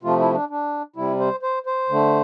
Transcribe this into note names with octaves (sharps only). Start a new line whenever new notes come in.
C3 F3 A3 F4
E4
D4
D4
C3 G3 E4
C5
C5
C5
D3 A3